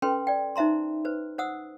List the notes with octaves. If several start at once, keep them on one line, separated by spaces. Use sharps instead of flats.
C#4 A4 B4 G5 C6
D5 G5
D#4 C5 E5 A#5 C6
B4 C5
C5 F#5 D#6 E6